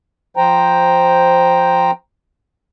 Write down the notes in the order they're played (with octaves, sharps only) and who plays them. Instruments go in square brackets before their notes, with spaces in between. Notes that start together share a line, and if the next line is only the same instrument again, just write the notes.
[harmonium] F3 C5 G5 A#5